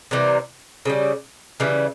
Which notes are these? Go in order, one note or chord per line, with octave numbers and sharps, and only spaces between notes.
C3 E3 G3 A#3
C#3 E3 G3
C#3 E3 G3